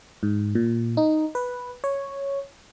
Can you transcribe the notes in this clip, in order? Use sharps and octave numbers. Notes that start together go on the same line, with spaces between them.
G#2
A#2
D#4
B4
C#5